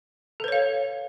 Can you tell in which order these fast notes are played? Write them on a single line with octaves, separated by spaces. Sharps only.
A4 B4 C#5 F5